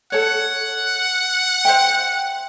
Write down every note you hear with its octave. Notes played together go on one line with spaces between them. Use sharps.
A4 C#5 F#5
C5 E5 G5